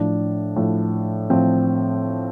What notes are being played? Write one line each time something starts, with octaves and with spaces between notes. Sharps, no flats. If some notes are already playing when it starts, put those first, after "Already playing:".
Already playing: A2 F3 D4
A2 F3
A2 F3 C4